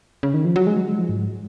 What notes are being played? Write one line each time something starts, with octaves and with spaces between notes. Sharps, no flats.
C#3
D#3
F3
F#3
G#3
F#3
G#3
F3
G#2